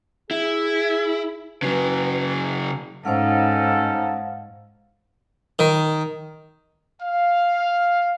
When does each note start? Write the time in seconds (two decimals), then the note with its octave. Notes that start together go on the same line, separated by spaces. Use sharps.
0.31 E4 G#4
1.62 C#3 F#3 B4
3.05 G#2 C#4 D#4 A4 C5 F5 F#5
5.59 D#3
7.02 F5